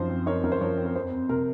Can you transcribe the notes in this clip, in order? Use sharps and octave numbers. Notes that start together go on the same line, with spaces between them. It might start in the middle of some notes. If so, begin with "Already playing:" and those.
Already playing: F#2 F3 D#4 C5
C4
D#4 A#4 C#5
F#2 A#4
C5
F3 A#4 C#5
C4
A#4
F2 C5
F2
C3 A#4